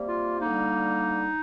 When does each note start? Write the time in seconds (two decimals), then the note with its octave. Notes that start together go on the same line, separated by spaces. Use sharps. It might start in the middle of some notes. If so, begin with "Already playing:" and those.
Already playing: C3 G3 A#3
0.08 F4
0.39 D3 G3 A#3 D#4